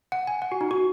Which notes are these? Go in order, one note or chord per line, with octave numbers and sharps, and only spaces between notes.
F#5
G#5
F#5
F#4
D#4
F#4